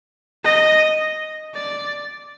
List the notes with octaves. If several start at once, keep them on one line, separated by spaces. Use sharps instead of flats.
D#5
D5